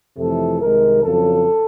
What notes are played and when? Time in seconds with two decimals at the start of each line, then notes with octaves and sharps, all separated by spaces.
0.18 F2 C3 E3 A3 A4
0.61 C2 C3 D#3 G#3 A#4
1.03 F2 C#3 F#3 A4